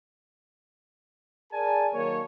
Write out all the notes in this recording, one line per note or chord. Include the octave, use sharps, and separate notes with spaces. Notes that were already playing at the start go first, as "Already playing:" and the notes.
G#4 A#4 D5 G#5 A5
D#3 F#3 A#3 C#5